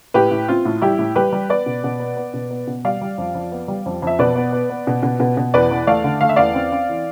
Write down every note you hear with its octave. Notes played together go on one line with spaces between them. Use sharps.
A2 G4 B4
A2
C4 F4
A2
G3 E4 G4
A2
G3 G4 B4
G3
B3 B4 D5
B2
B2
B3
B3
B2
B3
B2
G3 D5 F5
G3
F2
F2
B3
G3
F2
F2 E5
B2 B4 D5
B3
B3
B3
B2
B2
B2
B2
E2 B4 D5
E2
A3 D5 F5
D3
A3 F5
E5
E2 D5 F5
C4
C4
E3